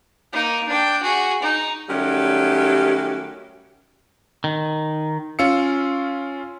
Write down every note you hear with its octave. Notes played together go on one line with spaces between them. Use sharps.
A#3 D#4
D4 G5
F#4 G#4
D#4
D#3 F#3 G3 A3 C#4 G4
D#3
C#4 F4 F5 E6 C#7